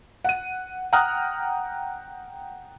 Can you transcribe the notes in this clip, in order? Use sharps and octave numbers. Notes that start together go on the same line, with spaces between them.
F#5 D#7
F#5 G5 A#5 D#6 F6 F#6